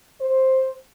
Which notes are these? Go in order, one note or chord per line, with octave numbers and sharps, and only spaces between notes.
C5